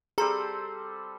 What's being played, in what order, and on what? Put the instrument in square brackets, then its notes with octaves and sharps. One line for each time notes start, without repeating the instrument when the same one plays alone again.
[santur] G3 C4 A4 [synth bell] G#4 A#5